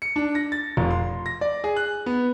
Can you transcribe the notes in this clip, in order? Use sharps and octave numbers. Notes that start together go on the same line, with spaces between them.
C#7
D4
A#6
A6
F1
C6
A#6
D5
G#4
F#6
B3